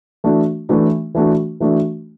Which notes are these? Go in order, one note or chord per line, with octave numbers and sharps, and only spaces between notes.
E3 A3 D4 F#4
E3 A3 D4 F#4
E3 A3 D4 F#4
E3 A3 D4 F#4